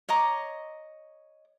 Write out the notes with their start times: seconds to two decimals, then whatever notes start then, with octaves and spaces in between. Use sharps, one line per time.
0.09 C#5 D#5 A#5 D6